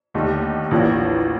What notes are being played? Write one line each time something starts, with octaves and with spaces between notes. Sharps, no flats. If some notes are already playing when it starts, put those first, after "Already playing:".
D#2 D3 A3 D#4 G4
A1 A2 F3 A#3 D4